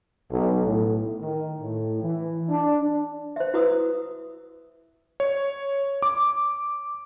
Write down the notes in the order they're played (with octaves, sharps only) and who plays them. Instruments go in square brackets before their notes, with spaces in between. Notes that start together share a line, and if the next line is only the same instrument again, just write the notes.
[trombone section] B1
A2
D#3
A2
E3
D4
[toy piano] C5 E5
E4 F#4 B4 A#5 D#6 E6
[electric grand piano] C#5
D6